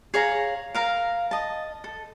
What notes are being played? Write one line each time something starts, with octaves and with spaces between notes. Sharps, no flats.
G#4 C#5 F5 A#5
A#4 F5 A#5
D#5 A5
A4